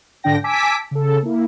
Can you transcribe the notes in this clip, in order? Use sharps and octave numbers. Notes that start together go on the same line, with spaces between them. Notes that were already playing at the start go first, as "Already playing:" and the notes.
G#2 D3 D4 G5 A#6
G#5 A5 D6 E6 B6 D7
C#3 A4
A#3 E4